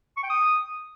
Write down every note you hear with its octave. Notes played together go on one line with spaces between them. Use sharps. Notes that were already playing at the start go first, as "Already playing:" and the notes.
C#6
G5
D#6